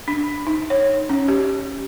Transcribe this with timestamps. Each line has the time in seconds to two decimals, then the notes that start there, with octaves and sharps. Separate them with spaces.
0.08 D4
0.47 D#4
0.70 C#5
1.09 C#4
1.28 G4